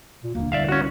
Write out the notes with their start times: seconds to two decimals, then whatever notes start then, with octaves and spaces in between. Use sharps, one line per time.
0.24 A#2
0.35 D#1 D3 A#3
0.52 C2 D5 E5 F5
0.69 C#4 F#4